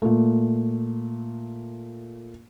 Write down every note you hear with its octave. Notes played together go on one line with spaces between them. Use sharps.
A#2 A3